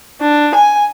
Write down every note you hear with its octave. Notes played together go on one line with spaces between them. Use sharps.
D4
G#5